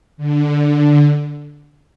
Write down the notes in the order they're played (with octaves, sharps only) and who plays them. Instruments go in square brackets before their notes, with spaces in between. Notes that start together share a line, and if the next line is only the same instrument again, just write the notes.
[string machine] D3